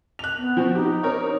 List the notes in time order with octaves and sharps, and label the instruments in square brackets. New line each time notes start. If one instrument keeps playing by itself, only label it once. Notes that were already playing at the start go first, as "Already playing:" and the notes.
[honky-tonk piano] F#6 F7
[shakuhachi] B3
[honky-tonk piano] F3 C4 F#4
[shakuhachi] D#4 [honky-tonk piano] G4
[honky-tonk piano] C4 A#4 C#5